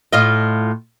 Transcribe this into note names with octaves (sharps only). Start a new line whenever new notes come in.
A2 F4 D#5